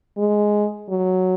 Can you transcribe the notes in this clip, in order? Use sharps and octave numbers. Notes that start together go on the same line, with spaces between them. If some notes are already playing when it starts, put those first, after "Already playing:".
G#3
F#3